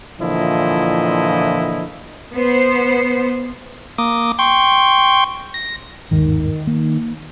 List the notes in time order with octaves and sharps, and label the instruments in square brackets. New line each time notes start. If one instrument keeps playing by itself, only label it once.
[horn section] A#2 D3 E3 F3 E4 D#5
[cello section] B3 C5
[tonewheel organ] A#3 D6 D#6
G5 C6 C#6
A#6
[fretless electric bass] G1 D#2 G#2 [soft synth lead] D#3
[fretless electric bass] A#3